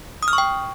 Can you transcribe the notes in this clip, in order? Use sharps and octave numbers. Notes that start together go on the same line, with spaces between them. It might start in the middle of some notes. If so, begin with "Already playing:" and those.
D#6
F6
C#6
G5